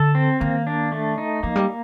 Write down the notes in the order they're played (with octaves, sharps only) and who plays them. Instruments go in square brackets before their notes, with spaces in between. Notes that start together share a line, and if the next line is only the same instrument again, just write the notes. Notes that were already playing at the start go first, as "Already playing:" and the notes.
Already playing: [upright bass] D3 [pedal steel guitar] A4
[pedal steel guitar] C4
[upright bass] D#3 [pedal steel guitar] A#3
[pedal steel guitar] D4
A3
D#4
[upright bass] F3 [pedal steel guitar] A#3
[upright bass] G3